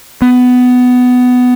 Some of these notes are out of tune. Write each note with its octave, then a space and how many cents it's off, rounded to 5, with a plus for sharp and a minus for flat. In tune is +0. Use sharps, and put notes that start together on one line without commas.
B3 +15